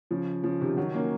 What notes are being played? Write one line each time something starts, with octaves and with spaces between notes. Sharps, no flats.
C#3 F3
C#3 F3
C3 D#3
D#3 F#3
A#3 C#4